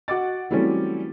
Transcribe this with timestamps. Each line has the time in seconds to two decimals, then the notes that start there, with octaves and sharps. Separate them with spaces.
0.08 F#4 D#5 F#5 D6 A6
0.51 E3 F#3 G3 A3 C4 C#4